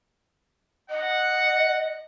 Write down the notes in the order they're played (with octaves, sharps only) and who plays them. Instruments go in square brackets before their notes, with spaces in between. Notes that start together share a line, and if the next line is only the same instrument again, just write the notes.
[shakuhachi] D#5 [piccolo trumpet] F#5